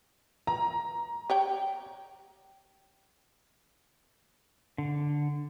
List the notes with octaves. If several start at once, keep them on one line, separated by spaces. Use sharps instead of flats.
A#5
G4 C#5 G5
D3